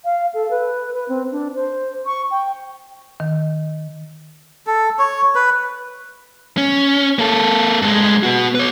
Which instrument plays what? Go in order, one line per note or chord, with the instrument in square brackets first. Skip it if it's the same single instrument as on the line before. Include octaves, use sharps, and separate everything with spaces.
[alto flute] F5
A4
B4
B4
C4
D4
C5
C#6
G5
[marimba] D#3
[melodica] A4
C#5
B4
[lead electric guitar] C#4
A#3 A4
G2 G#3
B3 F#4
B4 C#5